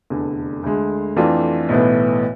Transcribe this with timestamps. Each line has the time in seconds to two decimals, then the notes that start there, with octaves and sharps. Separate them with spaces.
0.10 F1 E2 D3
0.63 D2 D3 G#3
1.17 F2 E3 A3 D4 F4
1.69 B1 A2 E3 B3